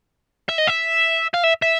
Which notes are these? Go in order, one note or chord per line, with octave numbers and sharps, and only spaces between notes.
E5
D#5
E5
F5
E5
E5